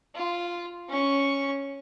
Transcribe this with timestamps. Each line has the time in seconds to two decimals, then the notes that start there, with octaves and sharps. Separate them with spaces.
0.15 F4
0.89 C#4 C#6